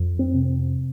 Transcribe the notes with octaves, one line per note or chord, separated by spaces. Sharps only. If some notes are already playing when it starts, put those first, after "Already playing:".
Already playing: F2
C4
C3